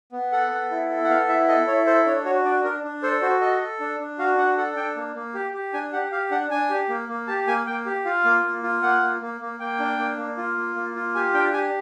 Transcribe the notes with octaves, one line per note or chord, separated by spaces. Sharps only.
B3
A4 F#5
B3
E4
A4
F#5
B3 F5
E4 E5
A4 D#5
E4 C#5
A4 C5
D4 C#5
F#4 C#5
D4 D5
D4 A#4
D4
A4 C5
F#4 C5
A4 D#5
A4
D4
D4
F#4 F5
D4 F#5
A4 F#5
D4 G5
A#3
A#3
G4
G4
D4 G#5
G4 F#5
G4 F5
D4 F#5
D4 G#5
G4
A#3
A#3
G4 A5
A#3 G#5
A#3 G5
G4
F4 F5
A#3
A#3
F4
A#3 F#5
A#3
A#3
A#3
A#3 G5
D4
A#3
A#3
F4
A#3
A#3
F4
G4 G#5
D4 G5
G4 G#5